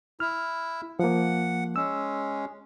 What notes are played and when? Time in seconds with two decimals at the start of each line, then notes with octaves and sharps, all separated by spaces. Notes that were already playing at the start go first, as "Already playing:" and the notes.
0.20 E4 F6
0.99 F3 A#3 F#5
1.76 G#3 C#4 E6